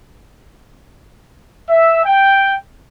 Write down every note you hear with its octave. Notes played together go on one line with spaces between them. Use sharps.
E5
G5